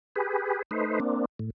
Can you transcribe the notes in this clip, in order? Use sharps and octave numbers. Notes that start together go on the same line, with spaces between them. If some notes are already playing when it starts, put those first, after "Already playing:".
G4 G#4 B4
A3 D#4 B4 C5
A#3 C4 D4
A2